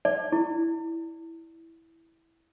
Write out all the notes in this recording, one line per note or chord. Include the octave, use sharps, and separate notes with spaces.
D5
E4